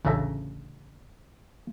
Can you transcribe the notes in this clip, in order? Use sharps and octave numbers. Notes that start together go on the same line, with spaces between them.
A1 D2 C#3 A4 E5 A#5